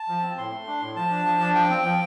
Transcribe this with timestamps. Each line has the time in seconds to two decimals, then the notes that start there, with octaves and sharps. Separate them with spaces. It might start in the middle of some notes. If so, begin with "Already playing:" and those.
Already playing: A5
0.08 F3
0.22 C4
0.37 A2 C6
0.52 A3
0.67 D4
0.82 A2
0.96 F3 A5
1.11 D4
1.26 F3
1.40 D4
1.55 F3 G5
1.70 C4
1.85 F3